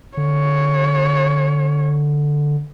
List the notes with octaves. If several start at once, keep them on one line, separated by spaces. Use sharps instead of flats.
D3 C#5